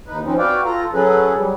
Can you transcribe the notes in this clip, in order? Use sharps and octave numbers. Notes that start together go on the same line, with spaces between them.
D#2 D#4 B4
F3 C4 C#4 D#4
F#4 B4 D5 F5 G5
F4 A4 A#5
F#3 C#4 G#4 A4 B4
F#3 G3